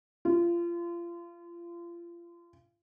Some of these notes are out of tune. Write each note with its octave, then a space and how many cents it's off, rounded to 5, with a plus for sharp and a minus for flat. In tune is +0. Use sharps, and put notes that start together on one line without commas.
F4 -30